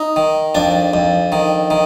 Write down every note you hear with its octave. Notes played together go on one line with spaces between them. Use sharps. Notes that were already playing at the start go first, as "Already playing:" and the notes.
Already playing: D#4
D#3
F2 D4
F2
D#3
D#3